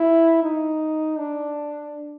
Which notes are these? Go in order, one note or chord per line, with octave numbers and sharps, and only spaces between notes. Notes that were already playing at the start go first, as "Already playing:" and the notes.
Already playing: E4
D#4
D4